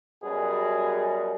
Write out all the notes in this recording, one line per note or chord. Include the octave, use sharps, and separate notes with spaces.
F#2 B2 G3 G#4